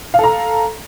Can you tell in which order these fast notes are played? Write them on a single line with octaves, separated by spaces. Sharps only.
F5 A4 A#5